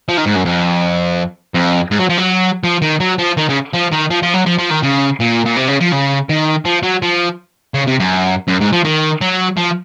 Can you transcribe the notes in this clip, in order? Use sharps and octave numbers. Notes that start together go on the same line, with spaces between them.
F3
D#3
G#2
F#2
F2
F2
G#2
F#3
F3
F#3
F3
D#3
F#3
F3
D#3
C#3
F3
D#3
F3
F3
F#3
F3
F3
D#3
C#3
A#2
A#2
C3
C#3
F3
C#3
D#3
F3
F#3
F3
C#3
C3
F#2
F#2
G#2
F3
D#3
F#3
F3